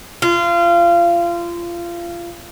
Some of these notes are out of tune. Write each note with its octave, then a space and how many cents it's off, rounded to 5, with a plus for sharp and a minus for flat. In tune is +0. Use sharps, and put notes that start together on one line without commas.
F4 -25